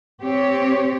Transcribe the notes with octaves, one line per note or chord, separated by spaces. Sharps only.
C4 G4 C#5